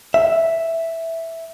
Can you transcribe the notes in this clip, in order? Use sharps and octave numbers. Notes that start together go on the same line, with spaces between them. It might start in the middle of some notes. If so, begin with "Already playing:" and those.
E5